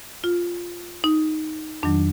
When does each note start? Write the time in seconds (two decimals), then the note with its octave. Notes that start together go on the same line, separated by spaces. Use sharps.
0.24 F4
1.04 D#4
1.83 F2 D#3 F#3 D4